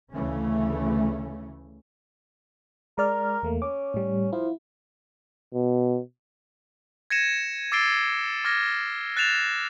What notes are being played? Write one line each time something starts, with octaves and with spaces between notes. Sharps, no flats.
D2 C#3 E3 A3 C#4
G#3 A#4 D5 F6
E2 A3 A#3
C#4 D6
A2 G3
F3 E4
B2
G#6 A#6 C#7 D#7 E7
D6 E6 A6 C7 D7 G7
D6 F6 G#6 A#6
F#6 A6 C7 E7 F7